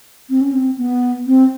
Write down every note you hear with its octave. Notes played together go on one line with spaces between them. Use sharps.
C4
C#4
C4
B3
C4